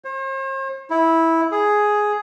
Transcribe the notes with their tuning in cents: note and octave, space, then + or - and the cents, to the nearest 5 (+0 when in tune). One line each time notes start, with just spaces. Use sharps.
C5 +45
E4 -10
G#4 +5